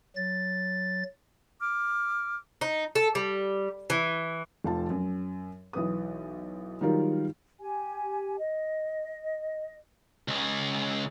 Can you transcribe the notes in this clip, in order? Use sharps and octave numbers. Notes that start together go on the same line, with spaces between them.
F#3 A6
D6 F6
D#4
A4
G3
E3
F1 F3 A5
F#2
B1 E3 B4 D#6
D#3 F#3 G3 D#4 F4 A#4
G4 G#5
D#5
C#2 G#4